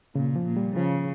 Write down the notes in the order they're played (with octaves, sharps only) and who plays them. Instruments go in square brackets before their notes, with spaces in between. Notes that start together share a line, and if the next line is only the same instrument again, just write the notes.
[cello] A#2 [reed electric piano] C#3
[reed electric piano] F3
[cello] A#2
[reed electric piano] G3
[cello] C#3 [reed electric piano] F3